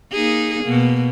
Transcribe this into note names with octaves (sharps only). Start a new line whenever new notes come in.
A#3 D#4 G#4
B2 A#3